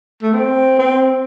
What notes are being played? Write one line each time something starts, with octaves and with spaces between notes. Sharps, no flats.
A3
C4
C4